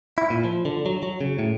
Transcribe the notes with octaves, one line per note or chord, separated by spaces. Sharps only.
E4
A#2
F3
D3
F#3
F#3
C#3
A2